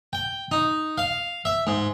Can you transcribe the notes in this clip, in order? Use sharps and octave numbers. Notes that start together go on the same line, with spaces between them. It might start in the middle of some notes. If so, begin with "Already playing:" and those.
G5
D#4
F5
E5
G#2